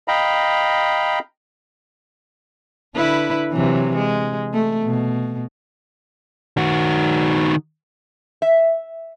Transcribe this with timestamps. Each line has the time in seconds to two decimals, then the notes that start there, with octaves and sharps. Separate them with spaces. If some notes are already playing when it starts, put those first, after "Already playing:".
0.08 D#5 F5 G5 A#5 B5
2.96 D3 E4 B4
3.52 C3 E3 F#3
3.95 G#3
4.54 A3
4.83 B2
6.57 D#3 F#4
8.42 E5